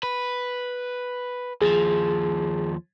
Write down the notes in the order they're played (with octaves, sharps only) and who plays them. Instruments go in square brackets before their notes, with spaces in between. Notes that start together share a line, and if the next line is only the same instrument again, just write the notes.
[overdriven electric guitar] B4
[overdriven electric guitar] D#2 F3 [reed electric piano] G#4